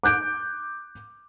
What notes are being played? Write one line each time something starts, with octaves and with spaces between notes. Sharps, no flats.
D6 F#6 G6 D7